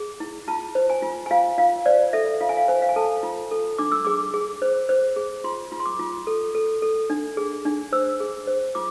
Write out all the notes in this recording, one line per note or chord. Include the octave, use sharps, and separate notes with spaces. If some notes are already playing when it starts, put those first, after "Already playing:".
Already playing: G#4
E4
F4 A5
C5
G#5
F4
G#5
F4 F5
F4 F5
C5 D5
A4 E5
F4 F5
G#5
F5
C5 G#5
F5
G#5
A4 A5
F4
A4
D4 D6
E6
G#4 D6
G#4
C5
C5
G#4
F4 C6
F4
C6
D6
F4
A4
A4
A4
D4
G#4
D4
C5 E6
G#4
C5
F4 D6